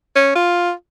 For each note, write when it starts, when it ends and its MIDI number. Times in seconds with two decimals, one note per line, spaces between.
0.15 0.30 61
0.35 0.71 65